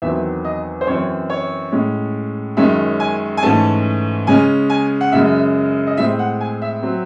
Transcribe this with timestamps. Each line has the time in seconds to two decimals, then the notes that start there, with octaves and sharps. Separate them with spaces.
0.02 E2 D#3 F#3 C4 E5
0.45 D#5
0.81 C5
0.87 F#2 E3 C4 C#5
1.30 C#5
1.72 A2 G#3 C#4
2.57 F#2 D#3 G#3 C#4 E5
3.00 G#5
3.37 G#5
3.42 G#2 E3 A3 C#4 A5
4.27 C#3 G#3 C#4 G#5
4.70 G#5
5.01 F#5
5.12 F#2 C#3 G#3 E5
5.87 D#5
5.97 A2 G#3 C4 E5
6.19 F#5
6.41 G#5
6.62 E5
6.83 F#3 C4